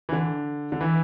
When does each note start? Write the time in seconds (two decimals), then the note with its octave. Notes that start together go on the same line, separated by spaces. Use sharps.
0.09 E3
0.12 D3
0.72 D3
0.81 E3